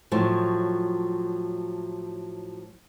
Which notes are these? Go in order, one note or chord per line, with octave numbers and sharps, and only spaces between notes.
A2 F3 F#3